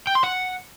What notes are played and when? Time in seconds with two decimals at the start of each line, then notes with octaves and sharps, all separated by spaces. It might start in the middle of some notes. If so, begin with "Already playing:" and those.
0.07 G5
0.15 C6
0.24 F#5